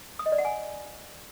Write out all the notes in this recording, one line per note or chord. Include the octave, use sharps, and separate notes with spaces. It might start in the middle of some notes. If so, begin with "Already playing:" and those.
D#6
D#5
D5
F#5
G#5